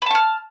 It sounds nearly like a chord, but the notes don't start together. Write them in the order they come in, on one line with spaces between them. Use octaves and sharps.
B5 A5 C#6 F6